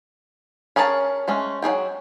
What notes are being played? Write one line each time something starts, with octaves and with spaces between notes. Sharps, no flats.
C#4 G#4 A#4 C#5 A5
G#3 A3 C#4
F#3 F4 G#4 G5